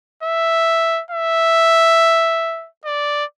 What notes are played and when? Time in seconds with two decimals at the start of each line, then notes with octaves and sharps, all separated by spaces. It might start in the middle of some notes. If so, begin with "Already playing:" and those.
0.23 E5
1.11 E5
2.85 D5